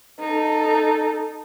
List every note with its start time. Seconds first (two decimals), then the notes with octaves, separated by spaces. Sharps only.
0.19 D#4 A4